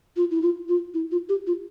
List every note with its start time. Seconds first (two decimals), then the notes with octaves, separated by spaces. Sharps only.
0.17 F4
0.31 E4
0.42 F4
0.69 F4
0.94 E4
1.11 F4
1.29 G4
1.47 F4